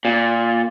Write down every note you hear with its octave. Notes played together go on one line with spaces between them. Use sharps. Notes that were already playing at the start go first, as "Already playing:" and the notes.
A#2